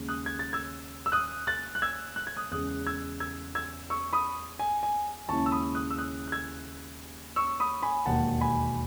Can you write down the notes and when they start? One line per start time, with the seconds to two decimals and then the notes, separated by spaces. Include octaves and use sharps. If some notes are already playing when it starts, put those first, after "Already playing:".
Already playing: D#2 C#3 G#3
0.08 D#6 F#6
0.26 G#6
0.39 A6
0.53 E6 G#6
1.06 E6
1.12 D#6 F#6
1.47 F#6 A6
1.75 F#6
1.82 E6 G#6
2.16 F#6
2.27 G#6
2.37 D#6 F#6
2.51 E2 C#3 G#3 D#6 F#6
2.87 E6 G#6
3.20 E6 G#6
3.55 E6 G#6
3.90 C#6 E6
4.13 B5 D#6
4.59 G#5
4.83 G#5
5.28 D#2 C#3 G#3 C#4 E4 A5 C#6
5.46 E6
5.52 B5 D#6
5.75 D#6 F#6
5.91 E6
5.98 D#6 F#6
6.27 F#6
6.32 E6 G#6
7.36 C#6 E6
7.60 B5 D#6
7.83 G#5 B5
8.06 E1 D#2 D#3 F#5 A5
8.41 G#5 B5